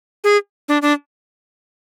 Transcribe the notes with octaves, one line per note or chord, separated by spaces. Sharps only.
G#4
D4
D4